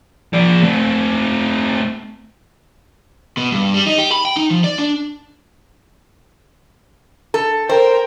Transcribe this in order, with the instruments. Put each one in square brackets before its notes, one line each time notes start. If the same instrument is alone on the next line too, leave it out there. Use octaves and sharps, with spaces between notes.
[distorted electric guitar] F3 D5
A3 C4
[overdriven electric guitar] B2
G2
G3
D#4
G4
B5
G5
D#4
F3
D5
D4
[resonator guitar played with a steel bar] A4
[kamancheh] A#4 G5 [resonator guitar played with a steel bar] C5